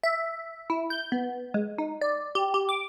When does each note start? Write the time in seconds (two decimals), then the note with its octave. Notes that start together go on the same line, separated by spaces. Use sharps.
0.03 E5
0.70 E4
0.90 G6
1.12 B3
1.54 G#3
1.78 D#4
2.01 D5
2.35 G4
2.54 G4
2.69 D6